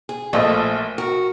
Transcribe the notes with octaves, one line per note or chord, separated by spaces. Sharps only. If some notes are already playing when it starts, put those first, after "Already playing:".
G#4
A#1 F3 A3 D#5
F#4 A#4